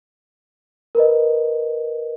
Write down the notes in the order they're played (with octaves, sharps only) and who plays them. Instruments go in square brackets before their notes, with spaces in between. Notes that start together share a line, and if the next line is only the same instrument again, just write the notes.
[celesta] A#4 B4 D#5